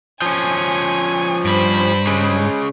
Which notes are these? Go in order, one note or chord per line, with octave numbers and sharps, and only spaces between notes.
F3 C#4 G#5
G2 C5 B5
C#3 G#3